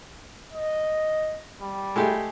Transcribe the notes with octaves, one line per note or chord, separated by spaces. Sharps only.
D#5
G3
G#3 A3 G4